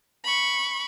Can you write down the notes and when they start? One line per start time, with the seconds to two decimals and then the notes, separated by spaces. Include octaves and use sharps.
0.24 B5 C#6